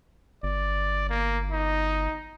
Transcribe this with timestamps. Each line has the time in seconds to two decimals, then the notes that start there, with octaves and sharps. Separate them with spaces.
0.43 G1 D5
1.10 A#3
1.52 D#4